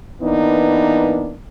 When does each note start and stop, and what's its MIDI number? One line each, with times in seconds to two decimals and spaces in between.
0.21 1.34 52
0.21 1.34 58
0.21 1.34 59
0.21 1.34 62
0.21 1.34 63